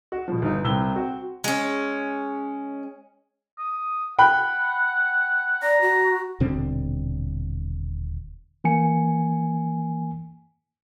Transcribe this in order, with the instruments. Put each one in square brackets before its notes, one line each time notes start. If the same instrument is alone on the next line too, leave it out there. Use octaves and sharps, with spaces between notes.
[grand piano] F#4
B2 F3
[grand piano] G1 [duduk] D#4
[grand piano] C2 E6 G7 [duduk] C4
[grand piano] F#4
[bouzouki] G#3 C#4
[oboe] D#6
[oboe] F#5 [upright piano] G5 B5 F#6
[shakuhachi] D5 [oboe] A#5
[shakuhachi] F#4
[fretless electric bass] D#1 B2 D3 C4
[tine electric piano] E3 A#3 G#5 C#7